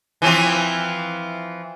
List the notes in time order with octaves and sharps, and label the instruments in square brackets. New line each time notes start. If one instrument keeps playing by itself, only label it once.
[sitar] E3 F3 C4